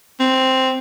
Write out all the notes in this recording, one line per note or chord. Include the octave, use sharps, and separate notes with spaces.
C4